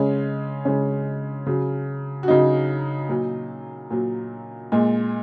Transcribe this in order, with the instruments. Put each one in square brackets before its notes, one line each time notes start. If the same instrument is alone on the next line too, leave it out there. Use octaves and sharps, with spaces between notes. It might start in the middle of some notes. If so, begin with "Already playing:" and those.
Already playing: [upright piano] C#3 G#3 C#4
C#3 G#3 C#4
C#3 F#3
F#4
C#3 F#3 D#4
A#2 F#3
A#2 F#3
A#2 G#3